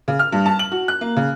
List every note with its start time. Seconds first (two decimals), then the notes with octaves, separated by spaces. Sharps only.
0.08 C#3
0.19 F6
0.32 G2
0.46 A5
0.59 F#7
0.72 F#4
0.88 F#6
1.01 A#3
1.17 C#3